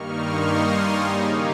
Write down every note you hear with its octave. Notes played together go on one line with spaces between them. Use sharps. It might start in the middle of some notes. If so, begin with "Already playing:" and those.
Already playing: G2 D#3 G3 A#3 D#4 C#6 F6
C6 D#6
G#5 C6
C#3 G3 A#3 D#4 C#5 F5